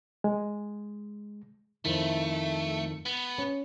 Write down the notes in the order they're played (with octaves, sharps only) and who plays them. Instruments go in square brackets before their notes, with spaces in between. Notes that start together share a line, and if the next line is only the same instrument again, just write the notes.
[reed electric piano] G#3
[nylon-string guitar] F2 D#3 E4 [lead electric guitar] A3
[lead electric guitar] B3
[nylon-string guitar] C#4